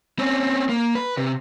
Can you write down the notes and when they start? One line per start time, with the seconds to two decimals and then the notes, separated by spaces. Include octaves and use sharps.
0.19 C4 C#4
0.69 A#3
0.95 B4
1.17 C3